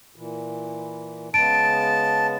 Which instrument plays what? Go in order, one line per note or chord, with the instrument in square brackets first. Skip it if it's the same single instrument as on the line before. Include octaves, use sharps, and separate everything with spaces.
[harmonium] A#2 E3
[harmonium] C#3 G#3 B3 [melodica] A5 [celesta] D7